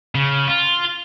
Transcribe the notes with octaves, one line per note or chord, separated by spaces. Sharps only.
C#3
F4